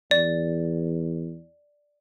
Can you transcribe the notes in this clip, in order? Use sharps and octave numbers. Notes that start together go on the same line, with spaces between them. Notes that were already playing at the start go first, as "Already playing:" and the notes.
E2 D5